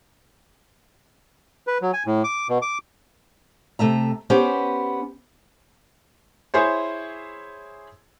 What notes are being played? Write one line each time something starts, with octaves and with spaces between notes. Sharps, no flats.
B4
F#3
G#5
A2
D6
B2
D6
C3 A3 E5 A#5
B3 C#4 G4 C5
E4 G#4 C5 C#5